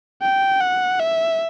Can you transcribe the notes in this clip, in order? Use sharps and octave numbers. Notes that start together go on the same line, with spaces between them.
G5
F#5
E5